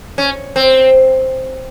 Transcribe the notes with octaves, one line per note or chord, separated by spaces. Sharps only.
C#4
C4